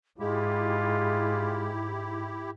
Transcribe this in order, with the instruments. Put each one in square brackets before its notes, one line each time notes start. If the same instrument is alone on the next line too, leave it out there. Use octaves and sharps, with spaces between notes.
[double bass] G#2 [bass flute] G#3 [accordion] E4 G4 [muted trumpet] F4